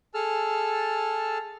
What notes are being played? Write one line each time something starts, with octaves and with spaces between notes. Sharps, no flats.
G#4 A4 A5 E6 F6